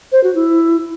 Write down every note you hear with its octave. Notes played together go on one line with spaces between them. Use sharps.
C5
F#4
E4